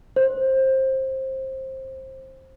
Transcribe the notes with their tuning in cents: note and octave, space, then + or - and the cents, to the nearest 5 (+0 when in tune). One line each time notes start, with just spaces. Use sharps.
C5 +20